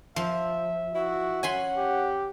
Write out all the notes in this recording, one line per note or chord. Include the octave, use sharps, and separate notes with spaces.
F3 E5
E4 F#4
C#4 F#5 G#5 B5 C6
G4